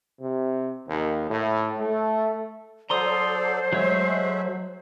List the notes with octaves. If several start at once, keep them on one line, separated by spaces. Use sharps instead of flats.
C3
D#2
A2
A3
F#3 A4 C5 D5 A#5 C6 D#6
F#3 G#3 A3 C#5 E5